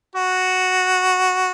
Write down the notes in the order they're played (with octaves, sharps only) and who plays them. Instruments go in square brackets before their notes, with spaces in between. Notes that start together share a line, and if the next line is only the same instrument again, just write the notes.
[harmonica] F#4